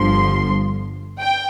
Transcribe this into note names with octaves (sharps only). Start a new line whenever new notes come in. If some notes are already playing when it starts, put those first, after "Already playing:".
Already playing: G1 G2 D3 F3 C6
G5